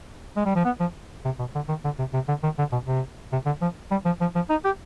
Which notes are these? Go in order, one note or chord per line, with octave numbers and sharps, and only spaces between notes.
G#3
G3
F3
B3
F3
C3
B2
D3
D#3
D3
C3
C3
D3
D#3
D3
B2
C3
C3
D3
F3
G3
F3
F3
F3
D#4
G4